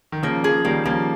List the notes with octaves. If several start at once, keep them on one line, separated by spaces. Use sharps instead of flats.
D#3
C#3 F3 A#3
C#3 F3 G#4
D#3 G3 A#3
C#3 F3 A#3